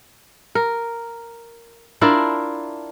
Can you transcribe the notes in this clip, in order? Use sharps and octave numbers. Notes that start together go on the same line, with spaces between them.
A#4
D4 E4 F4 A#4